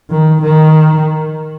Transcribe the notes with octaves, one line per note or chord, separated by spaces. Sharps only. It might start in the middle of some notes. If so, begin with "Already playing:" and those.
D#3
D#3